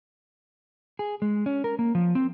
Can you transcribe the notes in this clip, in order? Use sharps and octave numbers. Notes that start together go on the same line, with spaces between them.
G#4
G#3
C#4
A#4
A#3
F3
C4